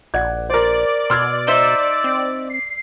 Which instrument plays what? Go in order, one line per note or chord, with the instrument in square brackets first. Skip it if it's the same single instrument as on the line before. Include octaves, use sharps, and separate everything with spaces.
[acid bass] A#1 [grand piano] D5 F#5 G#6
[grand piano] A#4 C5 [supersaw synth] D5
[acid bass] B2 [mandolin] C6 [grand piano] E6 F6 G#6
[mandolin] D#4 C5 E5
[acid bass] C4
[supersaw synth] C7